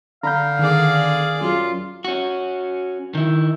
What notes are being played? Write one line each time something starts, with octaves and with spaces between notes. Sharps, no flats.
D3 F5 A#5 B5 G6
D#3 G#4 D5
F#2 F4
C#4 F#4
D#3 E4